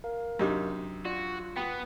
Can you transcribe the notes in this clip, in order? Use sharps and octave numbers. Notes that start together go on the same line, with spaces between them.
A#4 F5
F#2 C3 D4 D#4 G4 D6
F4 F#4 D5
B3 G5 B5 D#6